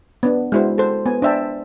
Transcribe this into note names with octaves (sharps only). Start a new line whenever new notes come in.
B3 D4
G#3 D4 E4 F#4 C5
A4 C5
B3 G#5
D4 C5 E5 G5 A5